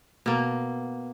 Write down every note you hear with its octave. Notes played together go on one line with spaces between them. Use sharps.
B2 A#3